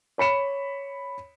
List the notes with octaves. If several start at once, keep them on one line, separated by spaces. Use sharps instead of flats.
C#5 B5 C#7 E7